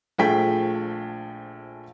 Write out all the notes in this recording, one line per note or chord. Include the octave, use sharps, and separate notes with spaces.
A#1 F3 A3 G#4 G5 B6